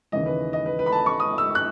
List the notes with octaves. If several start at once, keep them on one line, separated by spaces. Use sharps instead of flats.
D#2 C#3 E3 D#5
B4
D#5
B4
B4
B5
A5
C#6
D#6
E6
F#6